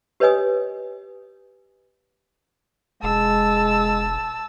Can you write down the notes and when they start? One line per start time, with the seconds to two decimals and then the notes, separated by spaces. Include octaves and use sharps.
0.20 G4 B4 C#5 D#5 G#5 D#6
3.03 E1 G#3 A5 E6